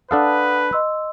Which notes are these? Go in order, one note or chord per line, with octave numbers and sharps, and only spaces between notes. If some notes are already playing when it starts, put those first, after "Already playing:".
D4 A4 B4 F5 F#5 D#6
D#5 C6 E6